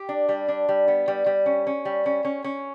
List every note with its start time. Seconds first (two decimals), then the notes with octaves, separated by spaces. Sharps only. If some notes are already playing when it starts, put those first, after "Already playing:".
Already playing: G4
0.09 D4
0.29 G3
0.48 D4
0.69 G3
0.88 B3
1.08 G3
1.26 G3
1.46 C#4
1.67 C#4
1.85 G3
2.06 C#4
2.25 C#4
2.44 C#4